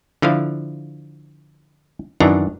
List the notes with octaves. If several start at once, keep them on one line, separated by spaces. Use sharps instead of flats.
D3 F3 E4 F5
F#2 D#3 E3 D4 A#5